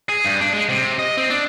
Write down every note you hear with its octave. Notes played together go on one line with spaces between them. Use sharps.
G#4
G2
D4
G#3
C3
D#5
C4
D4